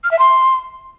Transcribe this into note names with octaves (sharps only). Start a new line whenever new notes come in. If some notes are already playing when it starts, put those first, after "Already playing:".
F6
E5
C6